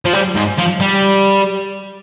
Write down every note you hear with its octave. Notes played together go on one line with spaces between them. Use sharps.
F3
G3
G#2
F3
G3